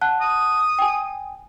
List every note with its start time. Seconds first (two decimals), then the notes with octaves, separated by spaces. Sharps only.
0.01 F#5 A5 F#6
0.21 D#6
0.79 G5 G#5